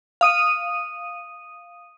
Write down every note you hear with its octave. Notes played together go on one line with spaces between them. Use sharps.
F5 D#6 D#7